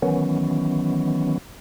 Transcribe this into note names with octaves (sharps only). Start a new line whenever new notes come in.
D#3 E3 F#3 B3 C#4